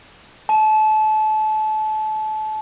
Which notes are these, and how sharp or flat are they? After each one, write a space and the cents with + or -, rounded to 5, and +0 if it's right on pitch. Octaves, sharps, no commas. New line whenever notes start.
A5 -30